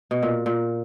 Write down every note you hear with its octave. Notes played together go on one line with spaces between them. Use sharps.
B2
A#2
A#2